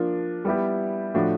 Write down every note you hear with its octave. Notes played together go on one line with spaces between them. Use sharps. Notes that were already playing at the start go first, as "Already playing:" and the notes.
Already playing: F3 A#3 D4 F4
G3 B3 E4 G4
A2 F3 A3 D4 F#4